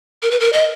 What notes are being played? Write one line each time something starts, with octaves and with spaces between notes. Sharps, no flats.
A#4
B4
A#4
D#5